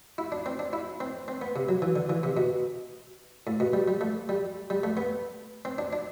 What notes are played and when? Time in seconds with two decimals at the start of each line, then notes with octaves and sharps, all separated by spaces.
0.18 E4
0.32 D4
0.46 C4
0.59 D4
0.73 E4
1.00 C4
1.28 C4
1.42 B3
1.56 C3
1.69 F#3
1.82 E3
1.96 D3
2.09 E3
2.23 C3
2.37 B2
3.47 A2
3.60 B2
3.73 G3
3.88 G3
4.01 A3
4.29 G3
4.70 G3
4.83 A3
4.97 B3
5.65 C4
5.78 D4
5.93 D4